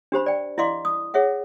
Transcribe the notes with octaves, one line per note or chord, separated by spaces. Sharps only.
D4 G4 C5 B5
D5 G5
E4 D5 D#5 F5 C6 D6
D#6
G#4 C#5 E5 F#5